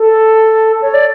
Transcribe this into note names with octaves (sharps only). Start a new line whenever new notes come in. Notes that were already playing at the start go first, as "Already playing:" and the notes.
Already playing: A4
C#5
D5